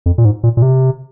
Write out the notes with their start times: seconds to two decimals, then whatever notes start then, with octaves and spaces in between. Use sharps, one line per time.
0.06 F2
0.18 A#2
0.25 G#2
0.43 A#2
0.57 A#2
0.62 C3